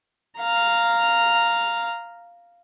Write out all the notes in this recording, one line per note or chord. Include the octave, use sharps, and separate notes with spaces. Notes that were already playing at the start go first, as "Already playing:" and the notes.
F5 A#5